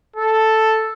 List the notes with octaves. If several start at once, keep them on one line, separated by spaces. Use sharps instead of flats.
A4